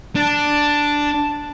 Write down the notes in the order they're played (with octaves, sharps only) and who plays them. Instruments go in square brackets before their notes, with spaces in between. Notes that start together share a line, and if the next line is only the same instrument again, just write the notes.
[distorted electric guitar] D4 [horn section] A5